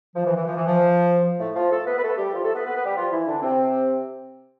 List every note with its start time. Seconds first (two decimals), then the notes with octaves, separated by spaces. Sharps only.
0.15 F3
0.25 E3
0.36 E3
0.46 F3
0.56 E3
0.67 F3
1.40 A2 A3
1.55 F3 F4
1.71 A3 A4
1.86 B3 B4
1.97 B4
2.02 A3 A4
2.18 G3 G4
2.33 F3 F4
2.43 A3 A4
2.54 B3 B4
2.65 B3 B4
2.75 B3 B4
2.85 G3 G4
2.96 F3 F4
3.12 E3 E4
3.27 D3 D4
3.42 C3 C4